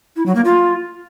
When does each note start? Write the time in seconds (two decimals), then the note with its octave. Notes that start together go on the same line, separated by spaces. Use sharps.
0.17 E4
0.26 F#3
0.35 A#3
0.45 F4